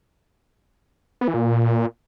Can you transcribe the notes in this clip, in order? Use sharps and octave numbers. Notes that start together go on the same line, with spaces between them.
B3
E3
A#2